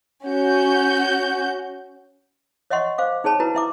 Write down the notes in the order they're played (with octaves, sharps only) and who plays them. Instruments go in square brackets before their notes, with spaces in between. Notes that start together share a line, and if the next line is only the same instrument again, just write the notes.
[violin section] C#4 F#4 G6
[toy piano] C#5 D#5 E5 F#5 C6 C#6
C5 F5 D6
D#4 G#4 C#5 A5 B5
E4 F#4 B4 A#5
E4 E5 D6